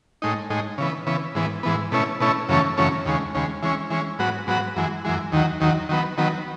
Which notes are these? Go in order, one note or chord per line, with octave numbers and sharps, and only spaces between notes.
A2 G#3 D#4
A2 G#3 D#4
C#3 E3 B3
C#3 E3 B3
G#2 E3 B3
G#2 E3 B3
B2 A3 C#4 E4
B2 A3 C#4 E4
F#2 C#3 E3 A3 C#4
F#2 C#3 E3 A3 C#4
D#2 C#3 G#3
D#2 C#3 G#3
E3 G#3 C#4
E3 G#3 C#4
G#2 F#3 B3 F#4
G#2 F#3 B3 F#4
F#2 E3 G#3
F#2 E3 G#3
D#2 D#3 F#3
D#2 D#3 F#3
D#3 F#3 B3
D#3 F#3 B3